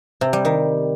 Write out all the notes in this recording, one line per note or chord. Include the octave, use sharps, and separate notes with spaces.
C3
G3
D#3